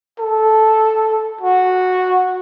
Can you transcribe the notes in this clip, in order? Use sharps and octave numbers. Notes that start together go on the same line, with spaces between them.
A4
F#4